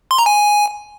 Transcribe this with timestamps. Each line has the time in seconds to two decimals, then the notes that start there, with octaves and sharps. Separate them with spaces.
0.11 C6
0.18 A#5
0.26 G#5